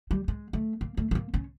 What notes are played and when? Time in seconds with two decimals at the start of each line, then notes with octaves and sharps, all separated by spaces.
0.11 G3
0.28 G#3
0.53 A3
0.81 A#3
0.97 A3
1.11 A3
1.15 A#3
1.34 C#4